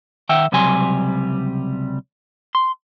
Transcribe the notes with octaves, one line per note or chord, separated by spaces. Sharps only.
D#3 E5 F#5 G5
C#2 C3 F#3 G3 G#5 C6
C6